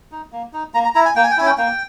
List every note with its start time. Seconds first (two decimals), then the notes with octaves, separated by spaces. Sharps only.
0.12 D#4
0.32 A#3
0.53 D#4
0.74 A#3 A#5
0.84 A#5
0.95 E4 A#5
1.05 G#5
1.16 A#3 G5
1.23 G#5
1.31 G5
1.37 C#4 E4 G#5
1.46 G5
1.58 A#3 G5